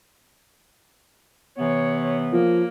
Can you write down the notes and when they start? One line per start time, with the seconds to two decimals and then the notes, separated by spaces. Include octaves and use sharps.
1.58 C3 E3 B3 C#5
2.33 F3 A#3